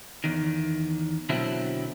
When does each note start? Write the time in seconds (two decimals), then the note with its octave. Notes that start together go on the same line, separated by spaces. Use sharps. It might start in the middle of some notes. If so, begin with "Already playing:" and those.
0.24 E2 D#3
1.29 B2 D3 F#3 C4 E4